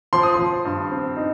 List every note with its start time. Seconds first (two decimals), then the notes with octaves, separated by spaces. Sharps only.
0.13 F3 C6
0.23 D#6
0.34 F3 C6
0.65 G2
0.91 C4
1.17 D#4